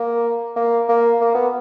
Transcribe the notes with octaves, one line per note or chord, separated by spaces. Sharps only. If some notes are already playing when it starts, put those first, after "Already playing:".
Already playing: A#3
A#3
A#3
A#3
B3